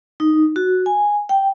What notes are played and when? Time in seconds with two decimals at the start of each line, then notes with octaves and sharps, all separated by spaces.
0.20 D#4
0.56 F#4
0.86 G#5
1.29 G5